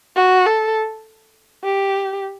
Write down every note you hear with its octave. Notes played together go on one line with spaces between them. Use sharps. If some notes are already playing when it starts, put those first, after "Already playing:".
F#4
A4
G4